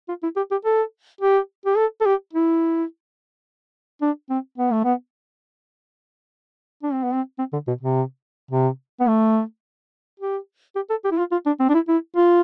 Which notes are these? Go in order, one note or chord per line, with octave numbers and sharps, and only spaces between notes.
F4
E4
G4
G4
A4
G4
G4
A4
A4
G4
E4
D4
C4
B3
A3
B3
D4
C4
B3
C4
C4
D3
B2
C3
C3
B3
A3
G4
G4
A4
G4
E4
F4
F4
D4
C4
D4
E4
E4
F4